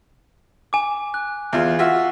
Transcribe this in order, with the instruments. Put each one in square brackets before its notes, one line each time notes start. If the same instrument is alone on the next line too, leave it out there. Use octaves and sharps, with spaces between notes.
[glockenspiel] G#5 D6
F#6
[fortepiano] E2 F4
F4 F#4 E5